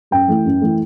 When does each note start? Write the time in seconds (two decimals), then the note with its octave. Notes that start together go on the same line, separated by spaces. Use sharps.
0.11 F#2 G5
0.28 E3 A3
0.45 F#2
0.61 E3 A3